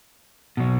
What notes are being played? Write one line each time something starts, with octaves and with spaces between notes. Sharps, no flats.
B2 F#3